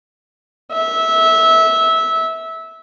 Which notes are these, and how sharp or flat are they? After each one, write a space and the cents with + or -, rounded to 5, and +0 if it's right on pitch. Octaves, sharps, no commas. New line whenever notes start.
E5 -20